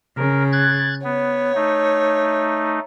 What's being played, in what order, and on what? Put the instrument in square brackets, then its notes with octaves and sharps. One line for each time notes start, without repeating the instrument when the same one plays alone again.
[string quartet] C#3 [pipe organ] A#4
[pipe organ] F#6 G#6 A6
[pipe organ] B3 [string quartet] C#5
[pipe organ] A3 D#4